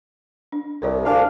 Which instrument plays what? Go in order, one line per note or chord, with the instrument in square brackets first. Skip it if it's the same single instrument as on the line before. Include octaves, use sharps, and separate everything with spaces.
[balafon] D4
[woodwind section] C2 [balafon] A#4 C#5 D5
[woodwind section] D2 D4 F5 [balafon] G#5 A5